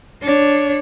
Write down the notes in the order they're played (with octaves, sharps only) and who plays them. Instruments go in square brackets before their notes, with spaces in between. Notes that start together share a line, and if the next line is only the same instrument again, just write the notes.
[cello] D4 C#5